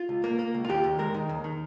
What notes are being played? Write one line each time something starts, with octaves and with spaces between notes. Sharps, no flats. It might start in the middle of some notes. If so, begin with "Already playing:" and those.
Already playing: F4
C#2
A#3
A#3
C#2
F4
D#2 G4
D#2
G#3 A#4
D#3
D#2
D#3